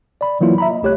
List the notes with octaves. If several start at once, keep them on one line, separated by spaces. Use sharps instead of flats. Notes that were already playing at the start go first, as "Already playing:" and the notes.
D5 B5
E3 F#3 A#3 E4 F4
E5 A#5 B5
D#5
C2 A3 G4 C#5 F#6